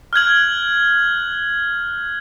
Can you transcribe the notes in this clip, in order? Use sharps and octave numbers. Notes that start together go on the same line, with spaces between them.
F6 F#6 G#6 F#7